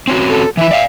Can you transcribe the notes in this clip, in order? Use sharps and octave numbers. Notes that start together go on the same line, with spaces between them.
C4 C#4 F#4
A4
E3 E4 E5
D5 F5